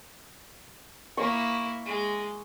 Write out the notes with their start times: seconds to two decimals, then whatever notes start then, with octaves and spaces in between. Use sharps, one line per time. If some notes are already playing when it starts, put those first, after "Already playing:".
1.17 A#3 E4 C#6
1.86 G#3